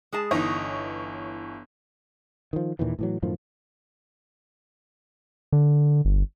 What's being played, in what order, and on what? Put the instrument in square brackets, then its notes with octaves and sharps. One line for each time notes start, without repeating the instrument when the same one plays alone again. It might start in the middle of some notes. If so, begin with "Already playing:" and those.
[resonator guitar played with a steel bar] G#3 G#4 A5
[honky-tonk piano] G1 E3 C#5 [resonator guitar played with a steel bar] D#4 D#5
[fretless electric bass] D#3 F3
D#2 A#2 D#3 E3
A2 E3 F#3
F#2 A2 D#3 F3
[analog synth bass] D3
G1